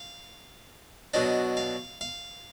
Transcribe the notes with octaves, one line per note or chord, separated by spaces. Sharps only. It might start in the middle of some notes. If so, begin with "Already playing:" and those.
Already playing: F5
B2 F#3 D4 D#5
F5
F5